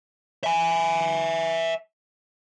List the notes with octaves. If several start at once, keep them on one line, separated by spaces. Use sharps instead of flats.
E5 G#5